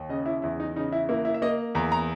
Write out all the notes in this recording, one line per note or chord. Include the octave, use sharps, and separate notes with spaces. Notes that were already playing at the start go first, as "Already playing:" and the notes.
Already playing: D#2
C#3 D#5
E4
E2 E4
D#4
C#3 D#4
E4
A#3 E4
E4
E5
A#3 D#5
E2 A#5
A#5